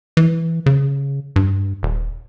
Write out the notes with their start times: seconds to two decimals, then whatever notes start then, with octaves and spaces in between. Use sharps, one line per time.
0.17 E3
0.66 C#3
1.36 G2
1.83 D#1